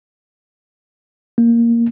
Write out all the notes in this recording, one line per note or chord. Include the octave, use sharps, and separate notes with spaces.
A#3